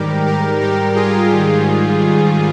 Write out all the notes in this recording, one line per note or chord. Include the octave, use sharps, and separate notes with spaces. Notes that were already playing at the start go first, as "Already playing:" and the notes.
Already playing: G#2 D#3 G3 G4 A#4
G4 A#4
G#2 G3 G4 A#4
F4 G#4
G#2 D#3 G3